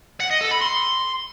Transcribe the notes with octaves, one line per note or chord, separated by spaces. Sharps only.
F#5
D#5
A4
B5
C6